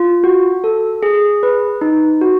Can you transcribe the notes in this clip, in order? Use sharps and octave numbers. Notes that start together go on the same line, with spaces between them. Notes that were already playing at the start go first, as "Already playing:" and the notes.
Already playing: F4
F#4
A4
G#4
B4
D#4
F#4